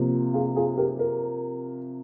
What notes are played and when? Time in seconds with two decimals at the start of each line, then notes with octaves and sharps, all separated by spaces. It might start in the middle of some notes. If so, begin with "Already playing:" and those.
Already playing: C3 F3 A#3
0.34 F4 G#4
0.56 F4 G#4
0.78 G4 A#4
0.99 A#4